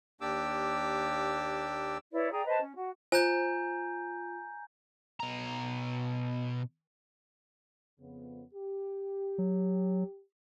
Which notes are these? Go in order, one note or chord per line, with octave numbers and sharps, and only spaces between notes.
D#2 A#3 D4 G4 D6 E6
E4 B4 C#5 D5
G#4 D5 G5 A#5
B4 C5 D#5 A5
C#4
F#4
F4 C5 G#5 A#5 G6
B2 A#5
F2 C#3 B3
G4
F#3